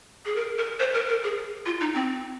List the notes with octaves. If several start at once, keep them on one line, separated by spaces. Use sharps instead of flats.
G#4
A#4
A#4
C5
A#4
A#4
G#4
F4
D#4
C4